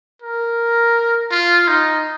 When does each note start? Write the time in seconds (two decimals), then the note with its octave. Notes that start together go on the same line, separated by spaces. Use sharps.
0.22 A#4
1.31 F4
1.68 D#4